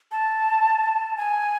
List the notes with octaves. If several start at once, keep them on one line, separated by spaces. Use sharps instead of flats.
A5
G#5